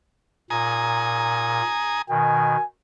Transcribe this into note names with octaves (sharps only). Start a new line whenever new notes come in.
A#2 G#5 A#5 D#6
B2 D#3 G#5